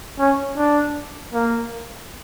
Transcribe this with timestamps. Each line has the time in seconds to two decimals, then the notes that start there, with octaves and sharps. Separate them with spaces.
0.19 C#4
0.57 D4
1.33 A#3